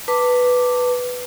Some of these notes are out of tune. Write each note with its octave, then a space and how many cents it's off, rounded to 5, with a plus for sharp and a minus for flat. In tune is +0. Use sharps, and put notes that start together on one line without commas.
B4 +0 A5 +30 D6 +0